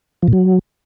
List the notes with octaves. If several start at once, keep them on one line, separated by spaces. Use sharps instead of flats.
F3
A#2
F#3